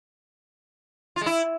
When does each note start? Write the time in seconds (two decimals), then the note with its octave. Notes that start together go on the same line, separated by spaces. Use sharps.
1.16 F4
1.21 G#3
1.26 E4